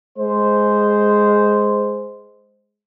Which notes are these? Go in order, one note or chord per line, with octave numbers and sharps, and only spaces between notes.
G#3 C5